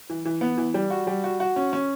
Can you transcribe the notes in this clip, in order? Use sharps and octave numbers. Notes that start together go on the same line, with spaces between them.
E3
E3
B3
E3
G3
F#4
G3
F#4
F#4
C#4
C#4